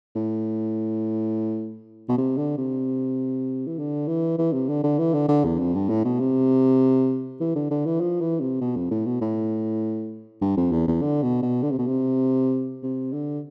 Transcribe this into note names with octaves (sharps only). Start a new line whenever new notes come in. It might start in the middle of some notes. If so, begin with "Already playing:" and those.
A2
B2
C3
D3
C3
E3
D3
E3
E3
C3
D3
D3
E3
D3
D3
E2
F2
G2
A2
B2
C3
E3
D3
D3
E3
F3
E3
C3
B2
F2
A2
B2
A2
G2
F2
E2
E2
D3
B2
B2
D3
C3
B2
C3
C3
D3